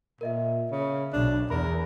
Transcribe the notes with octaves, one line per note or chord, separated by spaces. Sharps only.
A#2 A#4 D#5 E5
C#3
B1 D4
E2 A#4 B5